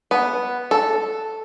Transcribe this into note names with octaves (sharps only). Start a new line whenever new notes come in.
B3
A4